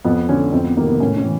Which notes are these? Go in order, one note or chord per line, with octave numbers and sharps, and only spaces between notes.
F2 B3
D3 C#4
F2 C4
B3
C3 D#3 A#3
B3
A2 C#4
C#4
E3